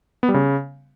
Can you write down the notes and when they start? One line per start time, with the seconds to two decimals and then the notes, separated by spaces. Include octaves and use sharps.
0.23 B3
0.29 G3
0.34 C#3